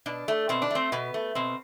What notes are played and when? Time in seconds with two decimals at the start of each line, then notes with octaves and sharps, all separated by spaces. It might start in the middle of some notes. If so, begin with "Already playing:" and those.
0.06 B2 D4
0.28 A3
0.49 B2 C4
0.62 D4
0.71 A3 C4
0.92 B2 B3
1.14 A3
1.35 B2 C4